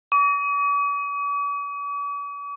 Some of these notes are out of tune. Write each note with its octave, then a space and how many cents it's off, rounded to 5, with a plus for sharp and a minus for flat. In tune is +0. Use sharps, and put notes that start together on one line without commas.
D6 -45